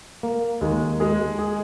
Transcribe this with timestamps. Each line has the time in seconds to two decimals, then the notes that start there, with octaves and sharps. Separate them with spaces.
0.23 A#3
0.61 D#2 G#3
1.00 G#3 G#4
1.39 G#4